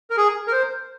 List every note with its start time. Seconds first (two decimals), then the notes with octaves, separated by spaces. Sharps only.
0.10 A#4
0.17 G#4
0.47 A#4
0.52 C5